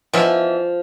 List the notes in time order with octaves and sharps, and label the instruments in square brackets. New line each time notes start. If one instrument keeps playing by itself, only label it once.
[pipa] B2 E3 E5 [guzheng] F3